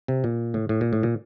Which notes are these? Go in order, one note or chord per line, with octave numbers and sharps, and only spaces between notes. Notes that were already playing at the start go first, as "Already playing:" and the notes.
C3
A#2
A2
A2
A#2
A2
A#2